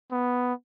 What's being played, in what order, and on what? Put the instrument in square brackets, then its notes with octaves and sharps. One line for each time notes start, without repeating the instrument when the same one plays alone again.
[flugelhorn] B3